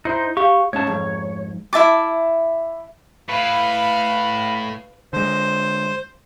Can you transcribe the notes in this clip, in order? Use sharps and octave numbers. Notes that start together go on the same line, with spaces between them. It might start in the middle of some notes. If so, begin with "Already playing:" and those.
D#4 E4 C5
G4 F5 C#6
G#2 C#4 C#5 A5
F2 G#2
E4 E5 A5 D6
A2 B4 F5 B5
D3 G#3 C5